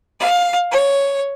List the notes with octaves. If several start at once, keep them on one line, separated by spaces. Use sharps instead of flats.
F5
C#5